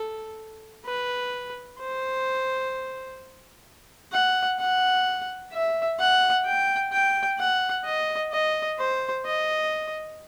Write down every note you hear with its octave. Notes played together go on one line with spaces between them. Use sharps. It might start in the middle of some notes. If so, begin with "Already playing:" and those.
Already playing: A4
B4
C5
F#5
F#5
E5
F#5
G5
G5
F#5
D#5
D#5
C5
D#5